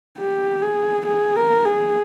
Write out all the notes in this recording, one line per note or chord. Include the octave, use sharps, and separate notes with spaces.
G4
G#4
G#4
A#4
G#4